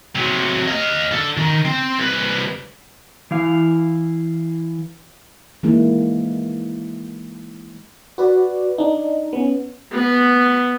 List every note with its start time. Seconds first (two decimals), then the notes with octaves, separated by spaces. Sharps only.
0.15 C3 F#3
0.67 D#5 F5
1.12 D3 A4
1.37 D#3
1.65 C4
1.98 C2 B4
3.31 E3 E4 F5
5.63 E3 G#3 A#3 D#4 E4
8.18 F#4 B4 D5
8.78 D4 D#4
9.33 B3 C#4
9.93 B3